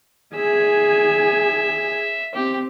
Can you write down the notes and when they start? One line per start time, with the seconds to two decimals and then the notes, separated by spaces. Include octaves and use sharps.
0.35 G#4 E5 G#5
2.35 C4 G4